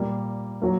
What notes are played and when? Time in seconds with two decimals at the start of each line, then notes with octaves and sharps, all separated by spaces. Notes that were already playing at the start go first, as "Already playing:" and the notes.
Already playing: A#2 G3 A#3
0.62 F#3 A#3